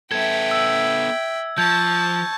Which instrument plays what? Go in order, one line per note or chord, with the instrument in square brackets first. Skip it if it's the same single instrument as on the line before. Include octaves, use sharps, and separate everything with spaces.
[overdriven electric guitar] B3 A4 [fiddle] E5 G5 [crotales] G#6
[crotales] E6
[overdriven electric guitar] F3 [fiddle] A5 C#6 [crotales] G6 G#6